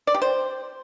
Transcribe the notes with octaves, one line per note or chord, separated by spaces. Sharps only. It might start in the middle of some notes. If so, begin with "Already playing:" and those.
D5
G4
C5